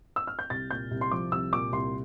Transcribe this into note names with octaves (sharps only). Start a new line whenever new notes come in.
E6
F6
G6
C2 A6
A#2 G6
C2
C6
F3 D6
C2 E6
A#2 D6
C2 C6